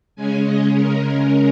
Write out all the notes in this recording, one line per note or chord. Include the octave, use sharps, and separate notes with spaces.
C#3 G#3 C#4 G#5
D#5
A#4